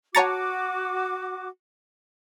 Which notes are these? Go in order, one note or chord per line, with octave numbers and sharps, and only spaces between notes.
F#4 C#5 F#5 A5 A#5 D6 A6 C#7